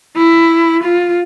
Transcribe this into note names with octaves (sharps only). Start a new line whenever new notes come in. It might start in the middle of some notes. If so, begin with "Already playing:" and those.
E4
F4